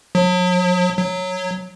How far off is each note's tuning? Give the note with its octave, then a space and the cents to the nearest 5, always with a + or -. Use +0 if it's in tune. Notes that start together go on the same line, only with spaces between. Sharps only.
F#3 -40
F#3 -10